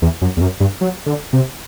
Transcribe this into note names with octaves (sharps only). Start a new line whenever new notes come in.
E2
F#2
E2
F#2
G2
F#3
D3
C3